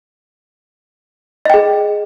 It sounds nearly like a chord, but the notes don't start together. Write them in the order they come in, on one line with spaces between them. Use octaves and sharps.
D#5 G5 G#4